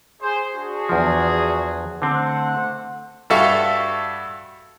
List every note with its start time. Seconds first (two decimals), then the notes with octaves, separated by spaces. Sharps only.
0.21 G#4 C5
0.54 D4 F#4 G#4
0.89 E2 F3
2.02 D3 A3 C4 C5 F#5
3.30 G2 F#4 A4 E5 F5 C#6